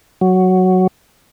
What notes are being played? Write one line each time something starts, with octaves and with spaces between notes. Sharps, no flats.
F#3